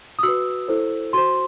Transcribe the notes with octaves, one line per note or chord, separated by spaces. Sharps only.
D#6
F#4 B4 E6
E4 A4 C5
F#4 C5 C6